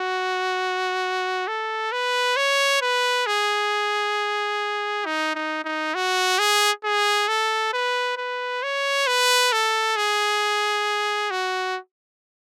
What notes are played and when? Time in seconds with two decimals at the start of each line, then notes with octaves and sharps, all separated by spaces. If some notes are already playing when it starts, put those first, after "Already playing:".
Already playing: F#4
1.48 A4
1.92 B4
2.36 C#5
2.82 B4
3.26 G#4
5.06 D#4
5.35 D#4
5.64 D#4
5.95 F#4
6.39 G#4
6.84 G#4
7.28 A4
7.73 B4
8.17 B4
8.63 C#5
9.07 B4
9.52 A4
9.96 G#4
11.31 F#4